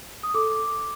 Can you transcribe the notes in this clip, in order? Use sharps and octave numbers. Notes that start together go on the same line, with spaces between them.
D#6
A4 D6